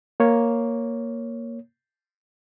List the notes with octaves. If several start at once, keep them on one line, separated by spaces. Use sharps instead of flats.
A#3 C#5